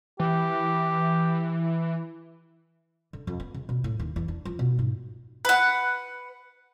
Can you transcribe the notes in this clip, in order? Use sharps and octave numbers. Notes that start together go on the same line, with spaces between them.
E3 G4
D3
F2
B3
C#3
B2
A2
D#2
E2
D4
F3
B2
G#2
B4 F#5